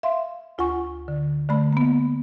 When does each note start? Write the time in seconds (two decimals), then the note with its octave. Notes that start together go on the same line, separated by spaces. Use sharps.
0.03 E5 F5 C6
0.58 D2 F4 F#5 G#5 C#6
1.08 D3
1.49 D3 A3 B5
1.73 A#3 B3